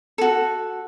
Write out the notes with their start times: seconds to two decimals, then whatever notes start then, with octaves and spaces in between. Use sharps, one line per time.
0.18 F#4 A4